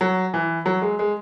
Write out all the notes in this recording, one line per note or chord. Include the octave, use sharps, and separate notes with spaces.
F#3
E3
F#3
G#3
G#3